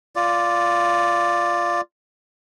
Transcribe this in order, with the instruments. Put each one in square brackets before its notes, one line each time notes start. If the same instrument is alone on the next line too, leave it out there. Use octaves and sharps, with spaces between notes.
[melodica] F4 D5